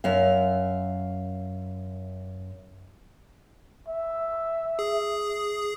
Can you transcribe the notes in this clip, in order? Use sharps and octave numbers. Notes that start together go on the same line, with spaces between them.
F#2 E5 F5
E5
G#4